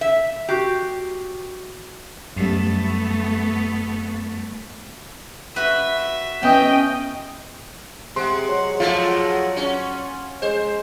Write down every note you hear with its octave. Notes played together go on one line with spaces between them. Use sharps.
E5
F#4 G4 C7
F#2 G3 A3 B3
F#4 B4 E5
B3 C#4 D#5 G5
C3 G#3 F#5 C6
F#3
F3 G#3 A3 F4
C#4
G#3 C5